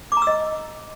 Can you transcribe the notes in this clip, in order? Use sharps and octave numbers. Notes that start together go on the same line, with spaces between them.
D6
A#5
E6
D#5